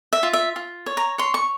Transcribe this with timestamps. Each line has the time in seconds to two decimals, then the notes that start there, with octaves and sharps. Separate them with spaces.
0.13 E5
0.23 F4
0.33 E5
0.56 F4
0.86 C#5
0.97 A#5
1.18 C#5 C6
1.34 C#6